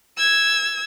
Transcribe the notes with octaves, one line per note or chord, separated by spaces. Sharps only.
E6 G#6